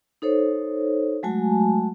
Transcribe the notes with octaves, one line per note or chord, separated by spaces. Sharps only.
D#4 A4 C5 C#5
F#3 G#3 A3 F#4 G#5 A5